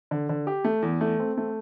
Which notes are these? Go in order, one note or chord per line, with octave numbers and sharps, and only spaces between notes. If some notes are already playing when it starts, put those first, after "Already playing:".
D3
D3
G4
A3
E2
A3
C4
A3